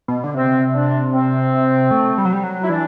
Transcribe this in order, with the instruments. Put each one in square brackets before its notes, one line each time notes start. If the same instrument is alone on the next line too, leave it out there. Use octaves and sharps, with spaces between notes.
[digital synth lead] B2
D3
[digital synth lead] C3 [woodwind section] C4
[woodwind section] D4
C4
[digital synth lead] A3
G3
F#3
G3
F#3
[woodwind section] E4
[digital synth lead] E3 [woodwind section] D4